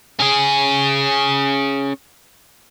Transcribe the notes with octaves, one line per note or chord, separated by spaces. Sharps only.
C#4 G#4